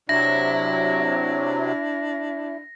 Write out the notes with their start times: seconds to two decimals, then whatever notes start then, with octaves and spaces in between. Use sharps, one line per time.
0.09 C3 F#3 D4 E4 A#6